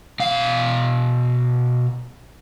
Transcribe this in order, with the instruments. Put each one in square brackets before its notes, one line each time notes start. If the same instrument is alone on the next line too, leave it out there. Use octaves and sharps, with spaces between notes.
[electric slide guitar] B2 F5